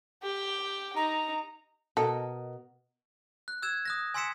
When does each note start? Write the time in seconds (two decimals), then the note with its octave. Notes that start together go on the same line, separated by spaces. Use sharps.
0.23 G4 G5
0.96 D#4 A#5
1.97 B2 A4 A#4 D#5
3.48 F#6
3.62 E6 F#6 G#6 E7
3.85 D#6 F#6 A#6
4.14 G#5 C6 E6 B6 C#7 E7